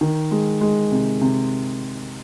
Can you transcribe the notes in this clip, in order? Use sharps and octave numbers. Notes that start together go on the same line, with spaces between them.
D#3
G#3
G#3
C3
C3